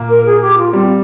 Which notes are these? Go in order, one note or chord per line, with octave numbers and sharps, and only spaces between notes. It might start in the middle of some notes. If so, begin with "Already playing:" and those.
Already playing: A#2 A#3
A#4
G#4
G4
F4
G3 C4